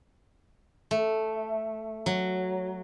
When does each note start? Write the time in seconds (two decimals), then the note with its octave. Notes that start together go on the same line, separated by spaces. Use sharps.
0.91 A3
2.06 F#3